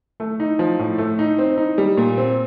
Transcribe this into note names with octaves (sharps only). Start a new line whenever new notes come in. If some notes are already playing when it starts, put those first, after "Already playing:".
A3
D#4
F3
A2
A3
D#4
C4
D#4
G3
A#2
C4